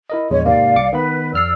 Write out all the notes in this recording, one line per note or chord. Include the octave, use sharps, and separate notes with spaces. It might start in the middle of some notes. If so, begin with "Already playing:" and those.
E4 A#4 D#5
A#1 E2 G#3 C#5
G#2 C3 A#3 D5 F5
C2 D6 C#7
D#3 B3 B4 B5
F2 D5 E6 F6 C7